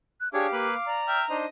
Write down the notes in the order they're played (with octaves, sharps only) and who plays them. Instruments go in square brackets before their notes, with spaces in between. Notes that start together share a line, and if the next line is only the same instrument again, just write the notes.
[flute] F#6
[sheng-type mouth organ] D4 G#4 C#5 [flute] G4 [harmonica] F5 D6
[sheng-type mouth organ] A#3 B4 B5
[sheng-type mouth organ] D5 [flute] A#5
[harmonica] E5 G5 F6
[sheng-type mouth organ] D4 D#4 C5 [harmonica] D#5